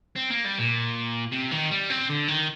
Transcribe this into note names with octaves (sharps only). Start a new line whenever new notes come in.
C4
A#3
G3
A#2
C3
D#3
G3
C4
D3
D#3